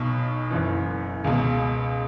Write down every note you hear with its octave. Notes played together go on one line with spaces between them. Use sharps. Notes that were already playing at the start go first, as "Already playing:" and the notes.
Already playing: B1 B2 C#6
F#1 F#2 E3
C#2 B2